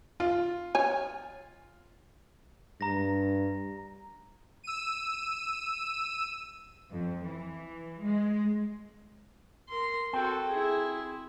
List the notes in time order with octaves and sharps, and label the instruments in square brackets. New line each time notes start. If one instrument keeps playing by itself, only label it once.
[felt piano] F4
[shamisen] C#5 G#5
[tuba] G2 [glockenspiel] A#5 A#6
[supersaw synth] E6 D#7
[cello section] F2
E3
G#3
[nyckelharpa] A#4 C6
[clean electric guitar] C4 G5 [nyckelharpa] F#4 A4
[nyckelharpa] E4 G#4